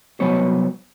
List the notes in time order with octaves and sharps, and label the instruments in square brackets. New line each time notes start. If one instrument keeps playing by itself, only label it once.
[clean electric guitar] C2 F#3 B3 C5 C#5